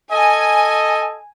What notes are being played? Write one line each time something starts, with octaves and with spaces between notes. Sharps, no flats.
A4 D#5 G#5